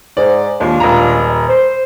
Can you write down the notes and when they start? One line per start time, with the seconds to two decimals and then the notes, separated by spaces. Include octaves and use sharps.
0.17 G#2 D5
0.61 D#2 G#3 D4 F4
0.80 D#1 A#5
1.48 C5